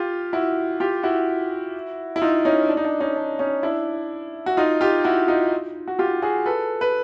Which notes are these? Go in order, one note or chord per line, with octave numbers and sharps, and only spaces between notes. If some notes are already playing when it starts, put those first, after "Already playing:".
Already playing: F4 G4
E4 F#4
F4 G4
E4 F#4
E4
D#4 F4
C#4 D#4
D4
D#4
D4
C#4 D#4
D4
C#4 D#4
D4 E4
F#4
D#4 F4
F4 G4
E4 F#4
D#4 F4
F#4
F4 G4
F#4 G#4
A4 B4
B4